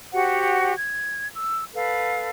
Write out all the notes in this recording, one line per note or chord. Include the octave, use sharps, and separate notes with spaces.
F#4 G4 C5 F#5
G#6
E6
A4 B4 F5